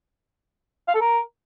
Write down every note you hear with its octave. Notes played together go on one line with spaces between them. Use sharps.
F5
A4
A#4